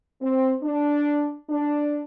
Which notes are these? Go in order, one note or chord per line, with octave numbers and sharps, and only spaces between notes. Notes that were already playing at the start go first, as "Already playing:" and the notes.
C4
D4
D4